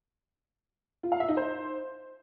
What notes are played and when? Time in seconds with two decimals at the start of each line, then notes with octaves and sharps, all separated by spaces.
1.03 F4
1.12 F5
1.20 E5
1.29 D#4
1.37 C5